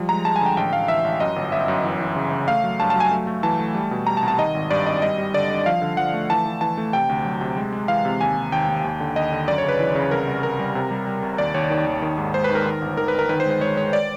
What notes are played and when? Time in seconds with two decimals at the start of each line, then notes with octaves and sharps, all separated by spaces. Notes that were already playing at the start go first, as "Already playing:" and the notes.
Already playing: F3 G3
0.09 G#3 A#5
0.25 G#3 A5
0.36 G#5
0.41 D3 G5
0.57 A1 G5
0.73 A1 F5
0.88 E3 E5
1.04 A1
1.20 F#2 D#5
1.36 G1
1.52 G1 E5
1.68 F#2
1.84 E3
2.00 E3
2.16 C#3
2.32 C#3
2.48 A3 F5
2.64 F#3
2.80 G2 A5
2.90 A5
2.96 F#3 G#5
3.11 A3
3.27 A3
3.43 E3 A5
3.59 A3
3.75 G3
3.91 B2
4.07 G3 A#5
4.17 A5
4.23 C2
4.28 A5
4.38 D#3 D#5
4.55 G#1
4.70 G2 D5
4.86 G#1 D#5
5.02 G3 D#5
5.18 G3
5.34 D3 D5
5.50 D3
5.66 F3 F5
5.82 D3
5.97 F3 F#5
6.14 A3
6.30 E3 A5
6.45 E3
6.61 E3 A5
6.78 A3
6.93 C3 G5
7.09 D2
7.25 F#3
7.41 C3
7.56 G#3
7.73 G#3
7.88 E3 F5
8.05 C3
8.20 D#2 G#5
8.36 D#2
8.52 D#2 G5
8.68 D#2
8.84 D#2
9.00 D3
9.16 D#2 D#5
9.32 D3
9.47 F#2 D5
9.58 C#5
9.64 C#3 B4
9.80 E3
9.95 C#3
10.11 C2 A#4
10.27 C2
10.43 C2 A#4
10.59 G3
10.75 C3
10.91 G3
11.07 G3
11.23 C2
11.38 D#2 D5
11.54 D#2 C#5
11.70 D#3
11.86 D#2
12.02 D#3
12.18 G#2
12.34 G#3 C5
12.44 B4
12.50 D#3 A#4
12.66 D#3
12.82 G1
12.97 D#3 A#4
13.08 B4
13.14 G1 A#4
13.29 D#3 B4
13.40 C5
13.46 G#3
13.51 C5
13.61 G#3 C#5
13.77 G#3 C#5
13.93 D5